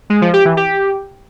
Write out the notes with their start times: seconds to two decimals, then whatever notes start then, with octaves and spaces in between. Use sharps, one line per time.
0.10 G#3
0.22 F3
0.33 G4
0.45 E3
0.57 G4